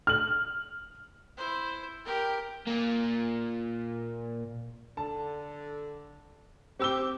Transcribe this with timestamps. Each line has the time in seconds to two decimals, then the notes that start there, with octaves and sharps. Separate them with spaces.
0.07 F6 F#7
1.37 E4 C5
2.05 G4 A#4
2.67 A#2 A#3
4.97 D3 A5
6.79 C4 G4 E6 G7